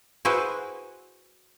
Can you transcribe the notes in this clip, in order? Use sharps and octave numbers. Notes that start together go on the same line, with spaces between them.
E4 F#4 G#4 B4 C5